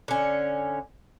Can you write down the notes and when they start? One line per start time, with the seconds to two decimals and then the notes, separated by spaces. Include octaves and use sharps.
0.08 D3 C#4